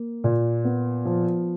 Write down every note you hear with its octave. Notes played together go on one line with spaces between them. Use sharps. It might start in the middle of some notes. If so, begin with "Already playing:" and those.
Already playing: A#3
A#2
B3
F3